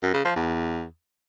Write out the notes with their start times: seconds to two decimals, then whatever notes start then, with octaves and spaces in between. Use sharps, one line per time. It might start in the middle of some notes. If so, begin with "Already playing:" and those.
0.03 F#2
0.14 C#3
0.25 F3
0.36 E2